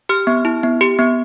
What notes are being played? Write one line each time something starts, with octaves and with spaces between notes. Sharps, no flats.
G4 F6
B3
E4
B3
G4
B3